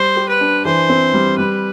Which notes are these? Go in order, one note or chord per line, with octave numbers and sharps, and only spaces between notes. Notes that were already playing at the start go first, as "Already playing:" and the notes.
Already playing: G3 C5
G4
B4
D4
E3 C5
C4
G3
G3 B4